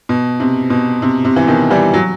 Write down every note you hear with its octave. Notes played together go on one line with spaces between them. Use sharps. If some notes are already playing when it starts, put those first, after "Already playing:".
B2
C3
B2
C3
C3
E3
B2 D#3
E3 G3
F#3